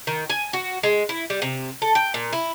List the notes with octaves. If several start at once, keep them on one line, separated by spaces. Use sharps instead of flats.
D#3
G#5
F#4
G#3
E4
G3
C3
A4
G5
A#2
E4